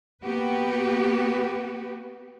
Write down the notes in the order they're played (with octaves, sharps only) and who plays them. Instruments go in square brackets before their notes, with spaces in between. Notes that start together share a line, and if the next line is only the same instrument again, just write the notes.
[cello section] A#3 B3 F#4 G4 B4